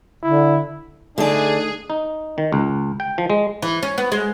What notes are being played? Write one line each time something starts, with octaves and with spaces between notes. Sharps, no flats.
D3 E4
D3 A3 D4 D#4 G#4 D5
D#4
D#3
C#2
G5
F3
G#3
E3
C#4
B3
G#3